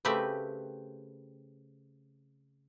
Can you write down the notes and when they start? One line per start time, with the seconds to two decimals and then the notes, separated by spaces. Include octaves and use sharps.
0.05 C#3 A3 C4 G4 B4 E5